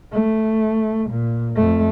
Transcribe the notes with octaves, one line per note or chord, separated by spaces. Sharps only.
A3
A#2
F2 A3